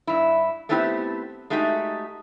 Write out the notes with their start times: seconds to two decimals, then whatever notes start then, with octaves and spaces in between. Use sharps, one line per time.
0.07 G2 E4
0.69 A3 B3 C4 E4 F#4 G4
1.50 G#3 A3 D#4 F#4 G4